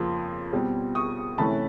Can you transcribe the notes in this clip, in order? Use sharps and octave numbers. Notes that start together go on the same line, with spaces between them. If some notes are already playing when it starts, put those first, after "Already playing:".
Already playing: F2 C#3 F3 A#3 C6
B2 G3 C4
C#6 D#6
C3 E3 A3 C#4 A5 B5